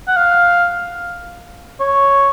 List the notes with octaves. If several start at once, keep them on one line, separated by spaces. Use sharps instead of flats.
F#5
F5
C#5